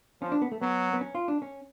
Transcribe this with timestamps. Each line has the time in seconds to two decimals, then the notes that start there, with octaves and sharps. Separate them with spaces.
0.21 F3 C#4
0.32 D4
0.42 B3
0.52 A3
0.61 F#3 B3
0.93 B3
1.01 C#4
1.15 F4
1.28 D4
1.42 C#4